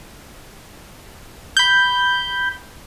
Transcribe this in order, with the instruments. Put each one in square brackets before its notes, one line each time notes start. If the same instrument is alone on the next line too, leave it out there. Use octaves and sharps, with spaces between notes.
[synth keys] B5 G6